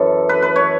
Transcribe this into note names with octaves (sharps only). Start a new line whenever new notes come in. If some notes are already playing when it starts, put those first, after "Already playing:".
Already playing: F#2 E3 A4
B4
B4
C#5